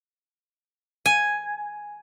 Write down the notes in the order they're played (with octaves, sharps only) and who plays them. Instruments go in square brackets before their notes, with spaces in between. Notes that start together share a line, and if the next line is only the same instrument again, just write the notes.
[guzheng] G#5